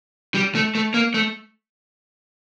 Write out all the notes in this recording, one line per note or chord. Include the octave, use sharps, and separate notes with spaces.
G3
A3
A3
A#3
A3